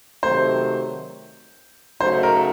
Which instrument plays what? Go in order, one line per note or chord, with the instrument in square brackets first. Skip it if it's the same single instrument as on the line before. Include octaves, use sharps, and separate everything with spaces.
[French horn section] C3 D#3 F#3 A3 [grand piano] C5
[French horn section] C#3 F#3 A3 D#4 F#4 [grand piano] C5
[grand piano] A#4